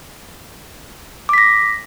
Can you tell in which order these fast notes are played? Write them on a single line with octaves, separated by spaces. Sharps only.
D6 B6 A#6